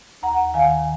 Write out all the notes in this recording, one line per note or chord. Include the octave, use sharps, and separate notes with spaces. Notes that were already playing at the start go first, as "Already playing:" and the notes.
D#2 F#5 A#5
D#3 F5 G#5